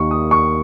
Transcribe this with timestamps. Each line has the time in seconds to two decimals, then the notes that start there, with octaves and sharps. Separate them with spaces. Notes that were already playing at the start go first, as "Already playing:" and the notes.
Already playing: D#2 D#3 A#3 C#6
0.11 D#6
0.31 C#6